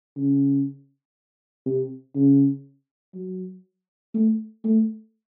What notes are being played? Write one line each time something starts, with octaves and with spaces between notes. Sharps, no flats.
C#3
C3
C#3
F#3
A3
A3